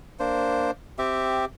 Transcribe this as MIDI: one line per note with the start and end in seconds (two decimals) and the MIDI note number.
0.20 0.71 58
0.20 0.71 62
0.20 0.71 72
0.98 1.45 60
0.98 1.45 67
0.98 1.45 76